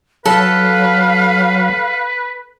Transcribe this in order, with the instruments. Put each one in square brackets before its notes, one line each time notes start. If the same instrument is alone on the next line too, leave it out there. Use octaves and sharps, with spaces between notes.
[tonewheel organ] F#3 [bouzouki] A4 [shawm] B4 [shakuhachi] F5